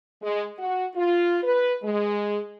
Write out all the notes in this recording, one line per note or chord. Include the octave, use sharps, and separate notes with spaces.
G#3
F#4
F4
B4
G#3